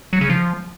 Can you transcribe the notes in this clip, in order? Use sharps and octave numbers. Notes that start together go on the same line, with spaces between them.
F#3
C#3
F3